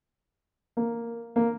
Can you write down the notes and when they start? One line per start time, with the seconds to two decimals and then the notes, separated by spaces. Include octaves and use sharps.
0.77 A#3
1.36 A#3